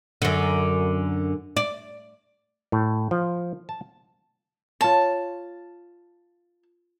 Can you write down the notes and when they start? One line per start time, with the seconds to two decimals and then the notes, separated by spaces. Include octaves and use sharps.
0.22 F#2 D3
1.57 D5
2.72 A2
3.11 F3
3.69 A5
4.81 F4 C#5 A5